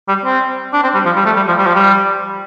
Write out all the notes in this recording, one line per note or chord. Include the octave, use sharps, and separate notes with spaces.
G3
C4
D4
C4
G3
F3
G3
A3
G3
F3
G3
F3
G3